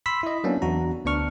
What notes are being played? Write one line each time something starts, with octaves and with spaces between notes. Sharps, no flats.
B5 C6 E6 B6
E4 D#5
F#3 A#3 B3 C#4 D4
E2 D4 F#4 A#5
D2 B3 D4 C#6 F6